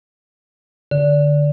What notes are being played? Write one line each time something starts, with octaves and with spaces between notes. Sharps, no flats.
D3